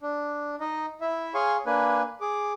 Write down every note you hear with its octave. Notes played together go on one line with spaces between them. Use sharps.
D4
D#4 D#5
E4 E5
G#4 C#5 F5 G#5 C6 C#6
A#3 D4 B4 G#5
G#4 D6